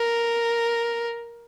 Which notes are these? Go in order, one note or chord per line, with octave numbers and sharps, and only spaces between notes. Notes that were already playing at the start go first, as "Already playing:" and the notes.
Already playing: A#4